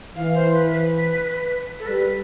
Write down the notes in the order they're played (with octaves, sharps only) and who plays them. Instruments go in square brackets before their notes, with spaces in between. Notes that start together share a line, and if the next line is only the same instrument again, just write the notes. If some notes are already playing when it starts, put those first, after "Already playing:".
[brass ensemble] E3 [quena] F5
[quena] C5
B4
B4
A4
[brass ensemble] G3 [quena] B4